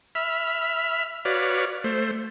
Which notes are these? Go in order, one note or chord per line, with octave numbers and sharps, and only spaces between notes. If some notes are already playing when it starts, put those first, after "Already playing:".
E5 B5 F6
F#4 B4 C#5 D5 F5
A3 C5